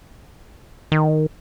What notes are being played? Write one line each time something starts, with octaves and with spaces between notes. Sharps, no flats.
D#3